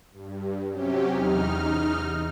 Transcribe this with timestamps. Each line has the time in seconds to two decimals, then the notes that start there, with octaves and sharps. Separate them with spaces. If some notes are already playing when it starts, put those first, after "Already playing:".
0.12 G2
0.70 C3 F#3 C#4 G4
1.10 E2 D#4 F6